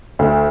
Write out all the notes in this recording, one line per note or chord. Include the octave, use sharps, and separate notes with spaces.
D2